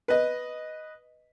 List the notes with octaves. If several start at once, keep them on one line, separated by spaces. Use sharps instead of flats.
B4 D#5